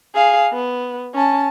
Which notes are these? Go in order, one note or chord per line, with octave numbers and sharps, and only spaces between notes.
G#4 F5
B3
C#4 A5